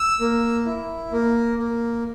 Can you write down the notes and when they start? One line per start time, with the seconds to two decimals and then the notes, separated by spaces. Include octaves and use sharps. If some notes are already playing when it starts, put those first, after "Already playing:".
Already playing: E6
0.20 A#3
0.66 E4
1.12 A#3
1.59 A#3